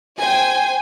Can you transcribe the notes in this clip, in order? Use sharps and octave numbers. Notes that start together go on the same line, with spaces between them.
C5 G5 G#5